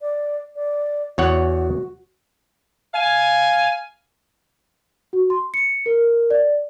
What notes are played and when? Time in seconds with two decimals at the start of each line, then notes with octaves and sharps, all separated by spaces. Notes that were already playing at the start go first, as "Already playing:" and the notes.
0.01 D5
0.56 D5
1.18 E2 F#4 C#5 F#5
2.94 F5 G#5
5.13 F#4
5.30 C6
5.54 C#7
5.86 A#4
6.30 D5